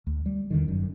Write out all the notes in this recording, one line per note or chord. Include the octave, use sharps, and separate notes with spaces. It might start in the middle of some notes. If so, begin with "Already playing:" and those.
D2
G3
E2 D3 D#3
G1 F#2